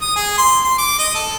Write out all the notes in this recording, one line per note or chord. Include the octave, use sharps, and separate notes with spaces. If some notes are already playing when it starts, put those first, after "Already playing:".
D#6
G#4
C6
C6
D6
D#5
A4